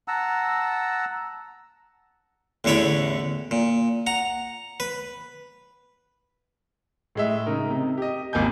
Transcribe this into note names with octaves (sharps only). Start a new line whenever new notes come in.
F#5 A5 A#5 E6
A1 E2 D3 C#5 D5 B5
A#2
F#5 A#5
B4
A2 G#3 E5
C#3 D#4 A#4
C3
G4 D#5
D#1 G#1 A#3 G#5 G6